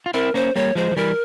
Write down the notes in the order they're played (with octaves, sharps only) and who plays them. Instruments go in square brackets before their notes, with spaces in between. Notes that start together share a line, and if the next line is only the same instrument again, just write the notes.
[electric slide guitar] F4
[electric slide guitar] C4 E4 [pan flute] A#4
[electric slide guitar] A#3 C#4 [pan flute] C5
[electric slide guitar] G3 A#3 [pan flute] C#5
[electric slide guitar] F3 G#3 [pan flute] C5
[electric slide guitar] F3
[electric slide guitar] E3 G3 [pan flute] A#4